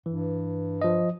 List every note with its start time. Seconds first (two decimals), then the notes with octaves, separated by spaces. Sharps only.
0.06 G2 E3
0.82 F3 D#5